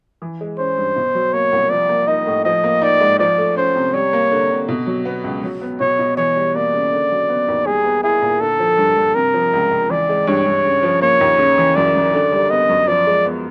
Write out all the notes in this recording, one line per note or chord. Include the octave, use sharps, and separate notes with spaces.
E3
G#3
C#4 C5
G2
B2
F#3
A#3 C#5
C2
F3 D5
A#3
D#4 D#5
A2
F3 D#5
A#3
D#4 D5
G#2
F3 D5
A3
C#4 C5
C3
G3 C#5
A#3
D3
D3
B2
F#3
B3
C#2
F#3
B3
B2 C#5
B2
E3 C#5
G3
A#3 D5
C#3
D3
F#3
B3
D#2
G3 G#4
B3
E4 G#4
A#2
D3 A4
F3
G2
G2
C3 A#4
F3
C#2
C#2
E3 D5
G#3
G2 C#5
G2
C#3
F3
A#3 C#5
D#2
C#3
E3
F#2 D5
F#2
D3
G3
B3 D#5
F#2
F3 D5
G#3
B3